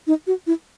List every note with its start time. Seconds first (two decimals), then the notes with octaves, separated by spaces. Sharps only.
0.07 D#4
0.27 F#4
0.47 E4